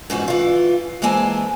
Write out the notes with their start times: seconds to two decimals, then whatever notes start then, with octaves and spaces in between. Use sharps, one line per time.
0.10 G#2 E3 G3 F#4
0.28 E3 F4
1.02 E3 G#3 A#3 C4 G#5 A5